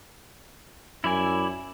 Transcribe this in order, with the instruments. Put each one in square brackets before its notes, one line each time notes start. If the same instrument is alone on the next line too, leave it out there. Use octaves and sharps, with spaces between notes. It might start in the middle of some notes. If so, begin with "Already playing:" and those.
[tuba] F#2 [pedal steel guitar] E4 D5 G#5